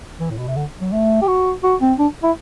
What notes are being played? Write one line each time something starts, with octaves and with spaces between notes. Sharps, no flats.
E3
A2
B2
C3
D3
F#3
A3
G4
F#4
F#4
C4
D4
E4